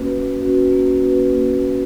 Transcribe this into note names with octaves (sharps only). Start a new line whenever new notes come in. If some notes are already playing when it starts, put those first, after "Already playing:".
Already playing: A#3 C#4 F#4 B4
A#3
C#4 F#4 B4
A#3
C#4 F#4 B4
A#3
C#4 F#4 B4